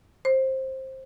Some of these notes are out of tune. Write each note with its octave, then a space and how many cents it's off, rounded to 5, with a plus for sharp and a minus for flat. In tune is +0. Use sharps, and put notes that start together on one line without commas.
C5 +15